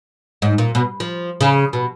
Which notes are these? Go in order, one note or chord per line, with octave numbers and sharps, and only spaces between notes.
G#2
A#2
B2
F3
C#3
B2